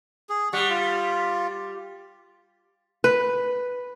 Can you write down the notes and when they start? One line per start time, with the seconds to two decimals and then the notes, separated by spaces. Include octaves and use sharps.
0.30 G#4
0.53 G3 F#5 C#6
0.70 F4
3.04 B4